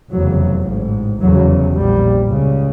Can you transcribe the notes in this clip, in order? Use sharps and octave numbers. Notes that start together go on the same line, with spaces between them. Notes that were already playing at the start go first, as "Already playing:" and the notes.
F1 E2 C#3 F#3
A1 G#2
F1 E2 C#3 F#3
A#1 A#2 G3
C#2 C#3